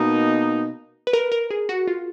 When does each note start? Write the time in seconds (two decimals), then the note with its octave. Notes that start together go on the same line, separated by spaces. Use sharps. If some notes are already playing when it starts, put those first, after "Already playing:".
Already playing: B2 A#3 D#4 A#4
1.07 B4
1.13 A#4
1.32 A#4
1.51 G#4
1.69 F#4
1.88 F4